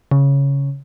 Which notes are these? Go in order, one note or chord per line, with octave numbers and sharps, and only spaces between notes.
C#3